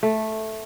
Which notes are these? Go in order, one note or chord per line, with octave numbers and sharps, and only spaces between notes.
A3